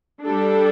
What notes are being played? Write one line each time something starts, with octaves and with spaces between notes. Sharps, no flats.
G3 D4 A4